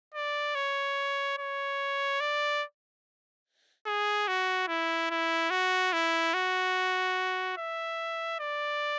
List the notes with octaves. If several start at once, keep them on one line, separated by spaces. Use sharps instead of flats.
D5
C#5
C#5
D5
G#4
F#4
E4
E4
F#4
E4
F#4
E5
D5